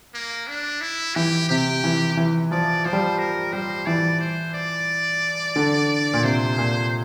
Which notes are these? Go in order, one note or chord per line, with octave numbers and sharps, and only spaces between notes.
A#3
D4
E4
E3 G4
C3 G4
E3
E3
F3 D5
F3 C5
G3
F3
A#4
G3 C5
E3 D5
C5
D5
D3
A#2
C3 C5
A#2